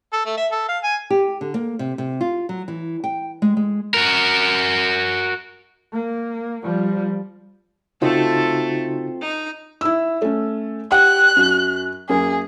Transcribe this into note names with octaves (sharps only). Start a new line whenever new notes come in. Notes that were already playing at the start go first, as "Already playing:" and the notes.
A4
A3
E5
A4
F5
G#5
G4
D3
A#3
C3
C3
F4
F#3
E3
G5
G#3
G#3
F#4 A#4
A#3
F3 G3
C#3 A3 C4 D#4 F4 F#4 A4
D#4
E4 E6
A3 C#4
G4 F#5 G5 F#6
F#2 F#4
F#2 A#3 G#4